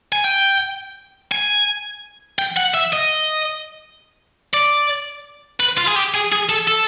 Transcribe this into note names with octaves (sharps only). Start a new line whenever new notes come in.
G#5
G5
G#5
G5
F#5
E5
D#5
D5
B4
F4
G#4
G4
G#4
G#4
A4
A4